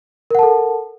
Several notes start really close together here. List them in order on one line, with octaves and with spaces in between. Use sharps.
A#4 F#5 A5 A4